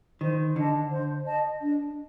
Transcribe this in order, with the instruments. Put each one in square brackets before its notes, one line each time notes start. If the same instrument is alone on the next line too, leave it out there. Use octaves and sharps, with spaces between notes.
[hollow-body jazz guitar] D#3 [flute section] C5
[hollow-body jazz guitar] D3 [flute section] D#5 A5
[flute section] C5
D#5 A5
D4